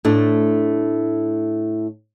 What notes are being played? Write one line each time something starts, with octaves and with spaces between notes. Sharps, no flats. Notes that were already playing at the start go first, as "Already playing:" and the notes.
A2 A3 D4